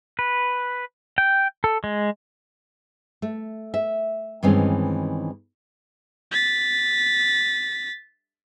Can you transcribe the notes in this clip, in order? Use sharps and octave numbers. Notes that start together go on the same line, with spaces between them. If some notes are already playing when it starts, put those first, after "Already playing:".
B4
G5
A4
G#3
A3
E5
G2 D#3 E3 G#3 C4 C#4
A6 B6